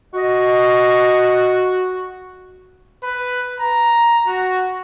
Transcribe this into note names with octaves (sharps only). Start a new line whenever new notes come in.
F#4 D#5
B4
A#5
F#4